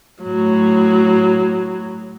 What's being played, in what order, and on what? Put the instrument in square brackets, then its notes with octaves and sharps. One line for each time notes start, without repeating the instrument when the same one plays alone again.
[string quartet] A2 F#3